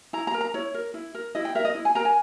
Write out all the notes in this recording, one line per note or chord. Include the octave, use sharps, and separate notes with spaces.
E4 A#5
A#5
A#4
A#5
E4 C#5
A#4
E4
A#4
E4 D#5
G5
A#4 E5
D#5
E4
G#5
A#4 A#5
G#5